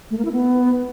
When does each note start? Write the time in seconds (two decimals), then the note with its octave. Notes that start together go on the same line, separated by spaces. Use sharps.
0.11 A3
0.18 A#3
0.25 E4
0.32 B3